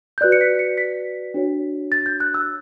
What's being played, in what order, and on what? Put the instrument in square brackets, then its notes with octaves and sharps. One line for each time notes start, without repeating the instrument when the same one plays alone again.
[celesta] G6
F#4 B4 D5 F#6
C#7
B6
C#7
B6
D4 F#4 C#5
A6
G6
F#6
E6